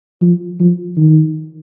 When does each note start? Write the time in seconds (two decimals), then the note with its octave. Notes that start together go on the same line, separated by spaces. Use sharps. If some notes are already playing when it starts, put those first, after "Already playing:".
0.21 F3
0.60 F3
0.97 D#3